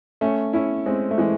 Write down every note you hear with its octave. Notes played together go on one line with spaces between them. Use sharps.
A3 C#4
C#4 E4
G#3 C4
A3
E3 G#3